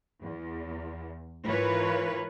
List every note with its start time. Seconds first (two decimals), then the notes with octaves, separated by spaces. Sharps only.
0.22 E2
1.44 G#2 E3 F4 A#4 B4 C#5